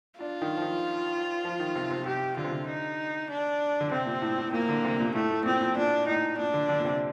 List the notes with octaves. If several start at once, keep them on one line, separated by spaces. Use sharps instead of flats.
D4 F4
D#3
F3
D#3
F3
D#3
C3
C3
C3 G4
D3 F4
C3
D3
D#4
D4
D3
C3 C4
A#2
A2
A2
A#2 A#3
D3
C3
A#2
A2 A3
A2
A#2 C4
A#2
A#2 D4
A2 D#4
A#2 D4
D3
D3
A#2
C3